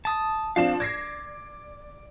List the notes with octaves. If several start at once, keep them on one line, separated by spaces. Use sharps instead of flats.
A5 D#6
F3 C4 D4 F5 E7
D5 G#6 A#6 C7